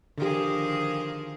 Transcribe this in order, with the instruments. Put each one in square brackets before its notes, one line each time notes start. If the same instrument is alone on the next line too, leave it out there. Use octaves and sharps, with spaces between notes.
[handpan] D3 G4 [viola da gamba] D#3 F3 G#4